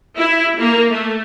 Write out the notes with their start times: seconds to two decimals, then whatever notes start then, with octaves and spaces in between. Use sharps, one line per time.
0.17 E4
0.58 A#3
0.90 A3